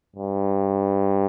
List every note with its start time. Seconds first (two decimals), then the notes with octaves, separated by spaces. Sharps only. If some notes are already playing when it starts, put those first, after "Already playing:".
0.16 G2